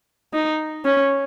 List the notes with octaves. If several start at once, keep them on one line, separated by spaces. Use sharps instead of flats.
D#4
C#4